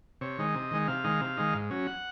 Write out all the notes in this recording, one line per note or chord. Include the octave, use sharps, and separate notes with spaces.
C3 C#5
D#3 G#3 D#4
C3 D#5
D#3 G#3 D#4
C3 F5
D#3 G#3 D#4
C3
D#3 G#3 D#4
G#2
F#3 C#4
F#5